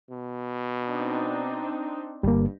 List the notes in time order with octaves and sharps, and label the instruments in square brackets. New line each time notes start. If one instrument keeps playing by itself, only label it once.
[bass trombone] B2
[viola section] C4 D4 D#4
[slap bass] G1 [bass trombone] G2 [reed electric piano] G3 A#3